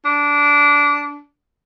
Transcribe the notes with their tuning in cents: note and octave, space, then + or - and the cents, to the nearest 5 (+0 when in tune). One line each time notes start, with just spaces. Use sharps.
D4 -15